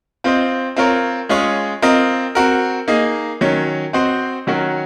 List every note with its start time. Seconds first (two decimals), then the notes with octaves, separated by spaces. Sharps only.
0.24 C4 F4 C5 D#5
0.76 C4 F4 A#4 C#5
1.29 G#3 C#4 F4 G#4 C#5
1.82 C4 F4 A#4 D#5
2.35 C4 F#4 A#4
2.88 A#3 D#4 G#4 D#5
3.41 D#3 F#3 C#4
3.93 C4 F#4 C5 D#5
4.47 D#3 F#3 C#4 F#4 A#4